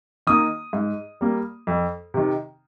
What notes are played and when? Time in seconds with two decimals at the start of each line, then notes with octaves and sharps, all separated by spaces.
0.27 D#3 A#3 D#6
0.73 G#2
1.21 G3 A#3
1.67 F2
2.14 C3 D#3